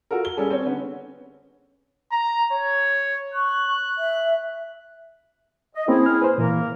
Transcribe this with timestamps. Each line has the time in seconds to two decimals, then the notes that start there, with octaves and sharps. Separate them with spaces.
0.11 F4 F#4 A4 A#4
0.25 G7
0.37 G3 C#4 G#4 A4
0.50 C4 C#5
0.66 D3 B3 C#4
2.12 A#5
2.53 C#5
3.34 C#6 F#6
3.98 E5
5.75 D#5
5.88 A#3 C4 C#4 E4 G#4
6.06 F6
6.22 B4 C5
6.38 A#2 E3 A#3 A#4